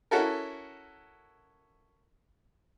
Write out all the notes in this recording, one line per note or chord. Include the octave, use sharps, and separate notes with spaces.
C#4 E4 F#4 A4 A#4